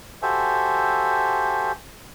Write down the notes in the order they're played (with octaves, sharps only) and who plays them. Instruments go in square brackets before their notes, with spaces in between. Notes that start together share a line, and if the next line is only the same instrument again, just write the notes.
[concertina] F#4 G4 A4 C5 E5 G#5